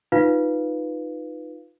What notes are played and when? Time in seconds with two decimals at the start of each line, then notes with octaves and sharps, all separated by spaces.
0.12 D#4 F4 B4 F5